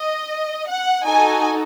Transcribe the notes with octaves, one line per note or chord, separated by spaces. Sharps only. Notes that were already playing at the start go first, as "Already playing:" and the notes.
Already playing: D#5
F#5
D#4 F#4 A4 G#5